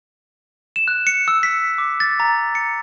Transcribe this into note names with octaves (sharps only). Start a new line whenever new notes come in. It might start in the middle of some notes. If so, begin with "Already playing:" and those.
E7
F#6
C#7
E6
B6
D6
A6
A#5
C#7